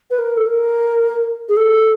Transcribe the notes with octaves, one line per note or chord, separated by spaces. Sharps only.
B4
A#4
A4
A#4
G#4
A4